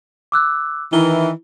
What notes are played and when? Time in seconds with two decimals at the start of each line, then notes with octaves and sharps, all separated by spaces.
0.32 D6 E6 F#6
0.93 D#3 E3 E4 G7